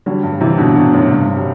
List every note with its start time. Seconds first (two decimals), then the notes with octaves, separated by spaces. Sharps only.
0.06 D3 F#3 G3
0.23 G2
0.32 G3
0.41 C3 E3
0.58 B2 D3 D4
0.75 B2 D3
0.85 D4
0.93 F#2 A2
1.11 G2 C3
1.28 G2
1.37 G3